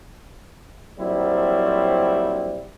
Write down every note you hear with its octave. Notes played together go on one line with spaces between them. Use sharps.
A#1 F#3 G3 C4 E4